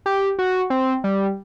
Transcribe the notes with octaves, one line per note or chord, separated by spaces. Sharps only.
G4
F#4
C4
G3